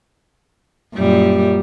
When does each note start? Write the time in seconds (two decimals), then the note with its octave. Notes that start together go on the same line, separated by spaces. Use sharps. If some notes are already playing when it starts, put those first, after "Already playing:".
0.95 F#2 A#2 G3